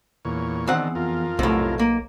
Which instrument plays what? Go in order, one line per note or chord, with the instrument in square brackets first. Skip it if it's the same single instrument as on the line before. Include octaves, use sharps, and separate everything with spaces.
[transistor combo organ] E2 A#2 C#5
[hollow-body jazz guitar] E2 C4 F#5 [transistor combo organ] D#3 D4
[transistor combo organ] F2 F4 A#4
[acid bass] B1 [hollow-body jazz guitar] A2 C3
[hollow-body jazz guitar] A#3